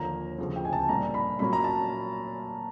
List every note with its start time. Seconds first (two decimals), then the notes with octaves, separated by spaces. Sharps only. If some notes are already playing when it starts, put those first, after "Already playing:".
Already playing: D#2 D3 F3 A#3 A#5
0.38 D2 C#3 F3
0.56 G5
0.65 G#5
0.73 A5
0.89 A#2 G3 A#3 D4 A#5
1.14 B5
1.39 A#2 F#3 A#3 C#4 B5
1.53 A#5
1.64 A5